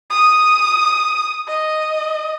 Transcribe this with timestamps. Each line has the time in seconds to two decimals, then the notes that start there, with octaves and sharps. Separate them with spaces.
0.10 D#6
1.48 D#5